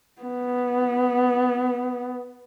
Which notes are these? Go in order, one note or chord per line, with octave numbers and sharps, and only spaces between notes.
B3